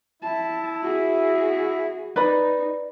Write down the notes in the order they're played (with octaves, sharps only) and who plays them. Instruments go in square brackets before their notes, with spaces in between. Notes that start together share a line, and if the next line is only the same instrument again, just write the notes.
[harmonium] E4 [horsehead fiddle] A5
[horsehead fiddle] F#4 G#4
[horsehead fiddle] D#4 [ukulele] B4 D5 B5